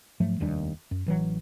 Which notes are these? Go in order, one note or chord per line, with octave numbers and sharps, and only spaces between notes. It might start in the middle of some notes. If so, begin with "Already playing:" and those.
G#2 F3 F#3 A3
F1 D#2 G3 D4
F#2
A1 E3 F#3